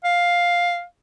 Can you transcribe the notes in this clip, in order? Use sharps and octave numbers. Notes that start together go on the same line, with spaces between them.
F5